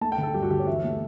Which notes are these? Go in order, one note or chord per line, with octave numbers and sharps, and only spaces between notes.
A3 A5
G5
D3
A4
G2 G4
F#4
D3 G4
C#5
E3 E5
A3